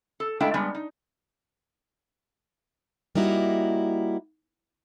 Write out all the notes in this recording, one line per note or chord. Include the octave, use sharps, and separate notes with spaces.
A4
G#3 A3 D4 E4 F5 G5
G3 G#3 B3 D4
D#4
G3 A#3 D#4 E4 F#4